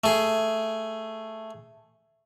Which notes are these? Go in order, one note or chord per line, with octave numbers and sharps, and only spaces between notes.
A3 G#4